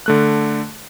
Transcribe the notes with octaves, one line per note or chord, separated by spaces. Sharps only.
D3 A3 F#6